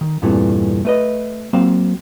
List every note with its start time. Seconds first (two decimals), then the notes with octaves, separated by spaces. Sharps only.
0.01 D#3
0.22 E2 G2 A#2 E3 A3 C4
0.85 A3 B4 D#5
1.53 F#3 A#3 C4 C5 F5